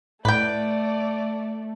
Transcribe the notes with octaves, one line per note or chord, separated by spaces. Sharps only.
A2 A3 B4 D5 G5